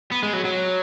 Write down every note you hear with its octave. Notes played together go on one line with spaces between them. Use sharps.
B3
G#3
F#3
F#3